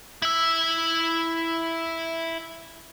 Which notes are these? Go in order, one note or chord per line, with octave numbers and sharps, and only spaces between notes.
E4 E5